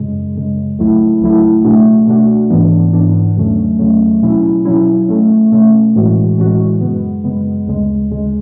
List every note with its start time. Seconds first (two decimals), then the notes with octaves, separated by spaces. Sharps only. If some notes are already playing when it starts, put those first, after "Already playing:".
Already playing: F#2 C#3 G#3
0.35 F#2 C#3 G#3
0.78 C#2 C#3 F#3 A3 E4
1.21 C#2 C#3 F#3 A3 E4
1.64 B2 A3 D4 F#4
2.07 B2 A3 D4 F#4
2.50 G#2 E3 B3 D4
2.93 G#2 E3 B3 D4
3.36 E2 C#3 F#3 A3 C#4
3.79 E2 C#3 F#3 A3 C#4
4.22 B2 F#3 C#4 E4
4.65 B2 F#3 C#4 E4
5.09 B2 A3 C#4
5.52 B2 A3 C#4
5.95 A2 E3 G#3 C#4 F#4
6.38 A2 E3 G#3 C#4 F#4
6.81 F#2 C#3 G#3 B3
7.23 F#2 C#3 G#3 B3
7.66 D2 C#3 G#3
8.10 D2 C#3 G#3